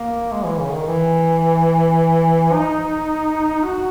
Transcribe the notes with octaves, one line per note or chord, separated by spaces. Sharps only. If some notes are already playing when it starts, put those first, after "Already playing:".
Already playing: A#3
G#3
E3
C#3
D#3
E3
D#4
F#4